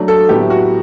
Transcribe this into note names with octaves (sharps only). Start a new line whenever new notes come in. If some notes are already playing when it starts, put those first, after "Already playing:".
Already playing: F#3 A3 D4
A4
A2 F#3 B3 E4 G4
F#4